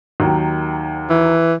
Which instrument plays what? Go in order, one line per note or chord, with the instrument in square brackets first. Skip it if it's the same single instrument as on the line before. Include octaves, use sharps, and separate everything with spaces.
[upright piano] D#2 D#3 F#3
[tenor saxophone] E3